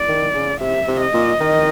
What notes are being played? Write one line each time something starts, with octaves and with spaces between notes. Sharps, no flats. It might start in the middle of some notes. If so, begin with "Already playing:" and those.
Already playing: D5
D#3
C#3
C3 E5
C3
D#5
A#2
D#3